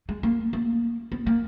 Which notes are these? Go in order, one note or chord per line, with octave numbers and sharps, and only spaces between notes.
G#3
A#3
A#3
B3
A#3